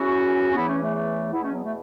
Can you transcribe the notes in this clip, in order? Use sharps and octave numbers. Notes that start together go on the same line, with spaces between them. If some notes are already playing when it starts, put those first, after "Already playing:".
Already playing: E2 C#3 E3 C#4 F#4
C#4
E2 C#3 E3 B3 E4
A3 C#4
A3
A3
E2 B2 B3 E4
A3 C#4
F#3 B3
A3